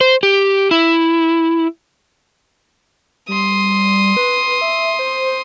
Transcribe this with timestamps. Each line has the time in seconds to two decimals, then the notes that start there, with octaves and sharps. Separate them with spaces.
0.01 C5
0.23 G4
0.71 E4
3.28 G3 C6 D#6
4.17 B4
4.61 E5
4.99 C5